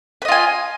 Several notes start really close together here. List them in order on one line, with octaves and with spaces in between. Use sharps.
B4 D#5 F4 G#5